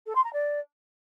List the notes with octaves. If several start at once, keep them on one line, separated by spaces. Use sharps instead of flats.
A4
C6
A#5
D5